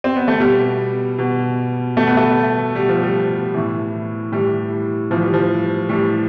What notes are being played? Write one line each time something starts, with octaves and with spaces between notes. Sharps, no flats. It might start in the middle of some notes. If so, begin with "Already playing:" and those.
C4
B3
A3
B2 G3
B2
B2 A3
B3
A3
B2 G3
F3
G3
A2 E3
A2 E3 G3
A2 E3 F3
G3
F3
A2 E3 G3